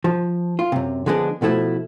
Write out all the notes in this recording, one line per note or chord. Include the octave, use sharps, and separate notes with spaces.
F3
F4
F#2 C3
D3 F3 G#3 B3 C4 D4
B2 F3 A3 E4